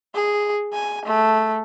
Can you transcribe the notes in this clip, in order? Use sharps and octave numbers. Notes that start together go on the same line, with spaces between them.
G#4
G#5
A3